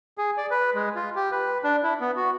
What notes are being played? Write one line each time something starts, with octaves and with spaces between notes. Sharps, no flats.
G#4
D5
B4
G#3
F4
G4
B4
D4
E4
B3
F#4